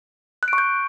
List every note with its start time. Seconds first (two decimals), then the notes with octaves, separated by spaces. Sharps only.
0.43 F#6
0.48 D7
0.53 C#6
0.58 G6